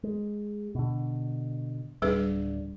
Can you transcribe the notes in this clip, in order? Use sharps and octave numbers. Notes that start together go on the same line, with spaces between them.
G#3
B2 D3
D1 G3 C#4 D4 G#4 B4